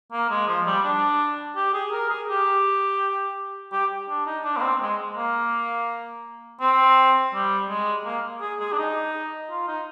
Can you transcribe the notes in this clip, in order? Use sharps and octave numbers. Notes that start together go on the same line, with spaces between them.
A#3
G#3
F3
G3
D4
G4
G#4
A#4
G#4
G4
G4
D4
D#4
D4
A#3
C4
G#3
A#3
C4
G3
G#3
A#3
G#4
G#4
D4
D#4
F4
D#4